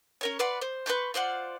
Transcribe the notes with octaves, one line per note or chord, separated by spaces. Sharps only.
C#4 A#4 C#5
B4 D5 F#5 C6
C5
B4 C6 C#6 G6
F4 C5 D5 F#5